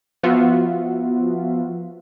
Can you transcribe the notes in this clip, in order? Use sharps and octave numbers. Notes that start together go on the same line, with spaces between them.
F3 B3 F4 F#4 E5